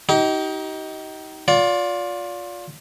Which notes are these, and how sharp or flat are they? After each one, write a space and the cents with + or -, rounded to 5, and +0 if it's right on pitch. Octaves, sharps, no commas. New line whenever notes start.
D#4 +20 G4 -35
F4 +25 D5 -25